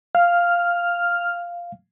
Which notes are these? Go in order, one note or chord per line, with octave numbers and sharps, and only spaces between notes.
F5 F6